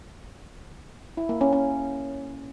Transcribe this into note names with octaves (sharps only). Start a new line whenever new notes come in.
E4
A#3
C#4
C#4